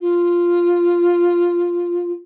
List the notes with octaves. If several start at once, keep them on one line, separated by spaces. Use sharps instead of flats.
F4